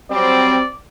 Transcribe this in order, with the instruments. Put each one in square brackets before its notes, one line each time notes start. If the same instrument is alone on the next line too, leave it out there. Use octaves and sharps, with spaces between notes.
[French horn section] F#3 G3 C4 [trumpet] D5